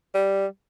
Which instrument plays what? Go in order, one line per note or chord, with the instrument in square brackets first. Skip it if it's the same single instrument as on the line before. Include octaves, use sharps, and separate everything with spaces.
[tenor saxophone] G3